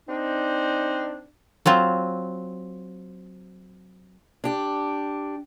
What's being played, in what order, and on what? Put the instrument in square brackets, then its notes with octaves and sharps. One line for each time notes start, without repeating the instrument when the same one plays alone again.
[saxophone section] C4 D4 D#4
[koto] F#3 C4 F4
[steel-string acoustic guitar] D4 G4